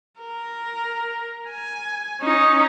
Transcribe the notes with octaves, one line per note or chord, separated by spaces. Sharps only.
A#4
G#5
C#4 D#4